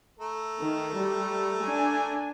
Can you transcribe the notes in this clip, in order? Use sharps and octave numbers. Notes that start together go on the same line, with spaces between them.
A3 A#4
D#3
G3
D4 G#5